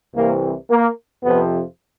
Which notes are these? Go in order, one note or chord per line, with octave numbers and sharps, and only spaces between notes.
C2 C3 E3 A#3
A#3
F2 C3 F3 B3